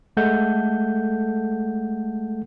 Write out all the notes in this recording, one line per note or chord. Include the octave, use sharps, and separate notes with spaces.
G#3 A3 A4 F#5 G6